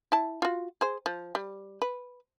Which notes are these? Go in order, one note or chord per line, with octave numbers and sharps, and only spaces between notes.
E4 A5
F4 F#4
G#4 C5
F3
G3
B4